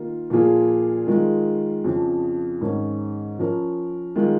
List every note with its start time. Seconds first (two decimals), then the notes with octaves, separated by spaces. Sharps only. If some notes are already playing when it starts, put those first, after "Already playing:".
Already playing: D#3 A#3 F4
0.30 A#2 F3 A#3 F4 G#4
1.07 D#3 G#3 F4
1.84 F2 C#3 F3
2.61 G#2 D#3 C#4 A#4
3.39 F3 C#4 A#4
4.16 D#3 G#3 F4